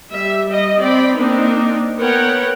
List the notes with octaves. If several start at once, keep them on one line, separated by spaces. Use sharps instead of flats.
G3 E5
G3 D#5
C4 D5 G5 B5
A#3 C4 D4 D#4
B3 A#4 B4 C#5 F#5 G5